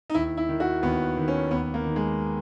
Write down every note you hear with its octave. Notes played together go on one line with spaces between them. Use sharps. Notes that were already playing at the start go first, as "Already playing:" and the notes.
D#4
D#2 E4
E4
D#3
F#4
D#2 B3
D#3
C#4
D#2 B3
A#3
D#3
G#3